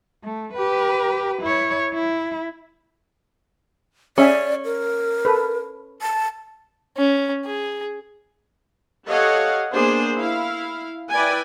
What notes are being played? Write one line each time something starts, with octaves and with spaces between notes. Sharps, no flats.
A3
G4 B4
E4 C#5
E4
C#4 G#4 D5 E5 G#5
A#4
A4 B4
A5
C#4
G#4
G4 A4 C#5 D#5 F5 F#5
A#3 B3 D4 G#4 C5
E4 F5
E4 B4 D5 G5 G#5